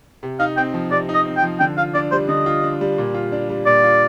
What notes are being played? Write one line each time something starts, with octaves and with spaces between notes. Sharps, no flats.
C3
D#4 F5
C4 G5
F3
C3 D5
D#4
D#5
C4
G5
F3
D3 G5
F4 F5
D4 D5
G3 C5
D3 D#5
F4
D4
G3
A#2
F4
D4
G3
A#2 D5
F4